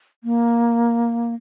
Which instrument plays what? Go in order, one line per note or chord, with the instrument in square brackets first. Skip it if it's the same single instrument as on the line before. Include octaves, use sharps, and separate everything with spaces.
[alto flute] A#3